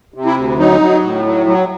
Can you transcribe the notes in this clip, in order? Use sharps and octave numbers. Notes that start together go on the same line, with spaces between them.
C3
E4
D2
F#3 D#4
F#3
A2
F#3
F#3